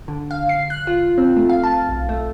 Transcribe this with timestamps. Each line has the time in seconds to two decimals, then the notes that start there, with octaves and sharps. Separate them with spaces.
0.08 D3
0.31 F5
0.49 C7
0.70 F#6
0.87 F4
1.18 C4
1.37 A3
1.49 F5
1.63 A5
1.89 B1
2.09 A3